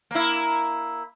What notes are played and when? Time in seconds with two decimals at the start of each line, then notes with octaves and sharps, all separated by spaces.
0.11 A#3 E4